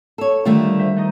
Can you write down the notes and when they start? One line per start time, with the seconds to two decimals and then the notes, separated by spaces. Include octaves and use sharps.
0.18 A4 C#5
0.45 D3 D#3 G3 A3 F4
0.79 C5 E5
0.96 A3 D#4 D#5